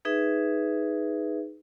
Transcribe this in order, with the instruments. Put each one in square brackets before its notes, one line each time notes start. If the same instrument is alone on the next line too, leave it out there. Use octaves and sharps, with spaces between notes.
[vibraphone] D#4 G#4 B4 E5